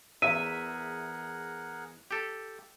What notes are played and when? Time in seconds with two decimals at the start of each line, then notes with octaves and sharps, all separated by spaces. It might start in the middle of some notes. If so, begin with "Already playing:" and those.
0.22 E2 G#4 A#4 E5 F#5 D#7
2.11 G4 A4